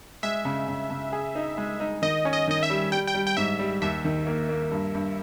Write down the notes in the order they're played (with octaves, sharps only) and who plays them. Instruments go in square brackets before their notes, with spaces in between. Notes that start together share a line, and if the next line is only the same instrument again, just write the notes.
[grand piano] G#3 [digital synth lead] E5
[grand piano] C#3
C#3
C#3
G#4
D#4
G#3
D#4
[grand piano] D#3 [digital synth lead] D#5
[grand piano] C#4
[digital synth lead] D#5
[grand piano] D#3 [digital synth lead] D#5
[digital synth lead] E5
[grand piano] G3
[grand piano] G3 [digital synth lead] G5
[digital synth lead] G5
[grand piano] G3
[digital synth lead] G5
[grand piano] G#2 [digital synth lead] E5
[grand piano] G3
[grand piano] D#2 [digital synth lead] E5
[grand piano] D#3
A#3
A#3
G2
G2